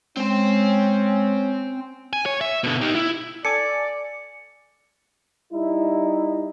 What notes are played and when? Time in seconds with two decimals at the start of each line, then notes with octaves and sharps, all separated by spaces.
0.17 G#3 C4 C#4 C5
2.13 G#5
2.26 C#5
2.41 E5
2.64 B2 D3
2.82 D#4 G4
2.95 E4
3.45 A4 D5 G#5 D6 C#7
5.53 G3 D#4 E4